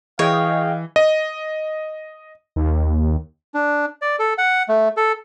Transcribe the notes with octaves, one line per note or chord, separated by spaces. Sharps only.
E3 G#4 C#5 D#5 F5 G5
D#5
D#2
D4
D5
A4
F#5
A3
A4